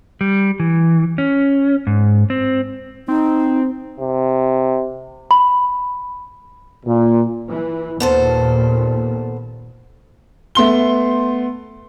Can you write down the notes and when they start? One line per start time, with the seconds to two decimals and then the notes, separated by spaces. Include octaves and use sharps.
0.21 G3
0.60 E3
1.18 C#4
1.87 G#2
2.30 C4
3.08 C4 D#4
4.00 C3
5.31 B5
6.86 A#2
7.49 E3
8.00 D#2 A#2 B3 A4 C5
10.55 A3 B3 C6 G7